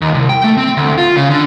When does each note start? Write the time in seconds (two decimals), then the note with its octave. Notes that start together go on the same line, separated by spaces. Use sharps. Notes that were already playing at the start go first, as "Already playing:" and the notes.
0.01 D#2
0.14 C2
0.29 G5
0.44 A3
0.57 C4
0.77 D2
0.98 F4
1.16 C#3
1.30 D3